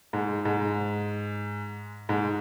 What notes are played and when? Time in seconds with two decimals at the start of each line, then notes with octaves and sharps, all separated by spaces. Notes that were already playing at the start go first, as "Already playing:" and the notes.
0.13 G#2
0.45 G#2
2.09 G#2